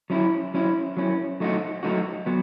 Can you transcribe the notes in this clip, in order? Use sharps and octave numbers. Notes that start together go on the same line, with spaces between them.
F#3 C#4 E4
F#3 C#4 E4
F#3 C#4 E4
F#3 A3 D#4 F#4
F#3 A3 D#4 F#4
F#3 B3